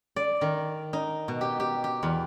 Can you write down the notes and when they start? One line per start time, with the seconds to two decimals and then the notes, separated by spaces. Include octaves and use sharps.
0.16 D5
0.41 D#3
0.93 D#4
1.28 B2
1.41 G4
1.60 G4
1.84 G4
2.03 E2